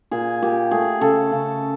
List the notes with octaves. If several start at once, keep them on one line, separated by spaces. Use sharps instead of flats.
A#2 G#4
A#2 G4
A3 G#4
C#3 A4
C#3